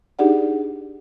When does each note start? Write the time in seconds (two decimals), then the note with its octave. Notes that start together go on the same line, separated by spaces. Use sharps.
0.19 D4 D#4 G4 G#4 D5 F#5